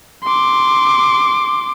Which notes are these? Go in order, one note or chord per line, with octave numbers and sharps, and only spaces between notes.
C6 D6